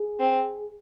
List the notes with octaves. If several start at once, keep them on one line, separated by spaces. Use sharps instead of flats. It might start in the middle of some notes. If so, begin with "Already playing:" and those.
Already playing: G#4
C4